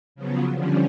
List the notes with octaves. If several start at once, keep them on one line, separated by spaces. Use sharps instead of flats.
C#3 F3 F#3 B3
D3 F3 G3 C#4